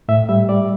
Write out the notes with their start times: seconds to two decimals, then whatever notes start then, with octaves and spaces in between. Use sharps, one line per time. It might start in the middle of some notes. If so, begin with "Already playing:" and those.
0.08 A2 E5
0.29 G3 E5
0.49 G3 D5